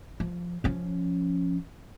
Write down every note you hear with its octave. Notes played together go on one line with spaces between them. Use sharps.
F3
F3 C#4